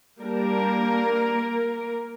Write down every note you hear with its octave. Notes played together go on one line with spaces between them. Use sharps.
G3 A#3 D4 A#4